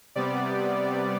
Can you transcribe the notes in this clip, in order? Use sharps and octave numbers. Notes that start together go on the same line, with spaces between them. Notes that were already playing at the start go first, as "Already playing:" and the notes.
C3 G3 B3 D5